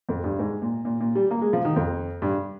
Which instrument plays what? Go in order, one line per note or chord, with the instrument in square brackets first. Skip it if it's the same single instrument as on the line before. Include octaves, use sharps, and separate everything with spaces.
[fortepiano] F2
G2
G#2
A#2
A#2
A#2
G3
A#3
G#3
F3
D#3
F2
G2